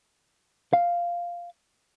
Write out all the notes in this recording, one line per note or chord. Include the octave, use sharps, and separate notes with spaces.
F5